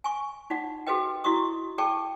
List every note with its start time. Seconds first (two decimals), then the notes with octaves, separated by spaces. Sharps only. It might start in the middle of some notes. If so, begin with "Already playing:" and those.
0.04 G#5 C#6
0.50 D#4 F4 D5 F#5
0.87 F#4 G#4 A4 B4 D#5 G5
1.24 E4 F#4 D5 D#5 C#6 D#6
1.78 G#4 A4 D5 G5 A5 C#6